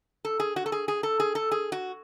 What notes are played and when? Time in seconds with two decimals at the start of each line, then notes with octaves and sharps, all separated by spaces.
0.25 A4
0.40 G#4
0.56 F#4
0.66 A4
0.72 G#4
0.88 G#4
1.03 A4
1.20 G#4
1.35 A4
1.51 G#4
1.72 F#4